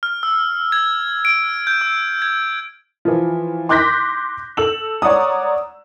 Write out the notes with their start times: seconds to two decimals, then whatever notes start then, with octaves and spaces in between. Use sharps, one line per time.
0.03 F6
0.23 E6
0.72 G#6
1.25 D7
1.67 G6
1.81 E6
2.22 G#6
3.05 E3 F3
3.69 C6 D6 F#6 G6 A#6 B6
4.57 A4 E6 F#7
5.02 C#5 D5 F#5 A#5 D#6